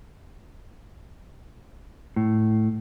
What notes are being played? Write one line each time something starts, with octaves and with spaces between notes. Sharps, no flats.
A2